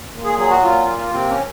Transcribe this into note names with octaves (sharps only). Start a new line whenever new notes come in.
A#2
G#4
F#3 G#4
F#4
A#2 F4
A#3
C3 C4
C#4